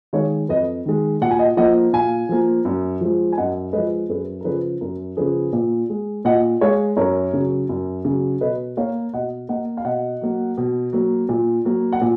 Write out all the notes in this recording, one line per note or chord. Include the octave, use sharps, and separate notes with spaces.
D#3 G#3 C#5 F5
F2 B4 D#5
D#3 G#3
A#2 F#5
G#5
D#5 F#5
F3 A#3 D#5 F#5
A#2 F5 G#5
F3 A#3
F#2
F3 G#3
G#5
F#2 D#5 F#5
F3 G#3 B4 D#5
F#2 G#4 B4
A#4
C#3 F3 G#4 B4
F#2 A#4
C#3 F3 G#4 B4
A#2
G#3
A#2 D#5 F#5
G#3 C#5 F5
F#2 A#4 C#5
C#3 F#3
F#2
C#3 F#3
B2 B4 D#5
A#3 C#5 F5
B2 D#5 F#5
A#3 D#5 F#5
F5
B2 D#5 F#5
F#3 A#3
B2
F#3 A#3
A#2
F#3 A#3
F#5
A#2